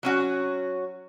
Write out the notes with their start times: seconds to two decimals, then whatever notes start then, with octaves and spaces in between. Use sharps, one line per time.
0.03 F#3 C#4 F#4